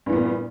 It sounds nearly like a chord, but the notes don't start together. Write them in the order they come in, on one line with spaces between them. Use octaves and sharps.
G2 E3 B3 A#2